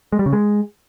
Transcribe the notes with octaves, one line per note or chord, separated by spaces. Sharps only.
G#3
G3
C#3
G#3